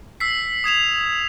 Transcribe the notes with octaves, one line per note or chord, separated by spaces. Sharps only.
E6 B6 C7
D#6 G#6 E7 F7